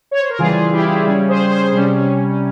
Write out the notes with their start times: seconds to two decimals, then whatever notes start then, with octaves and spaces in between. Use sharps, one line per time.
0.11 C#5
0.20 C5
0.30 A#4
0.39 C#3 E3 G3 F4 G#4
0.72 E4 G4
1.06 C#3 G3 C#4 F4 G#4
1.29 G#4 C5
1.50 G#4 C5
1.72 C3 G3 C#4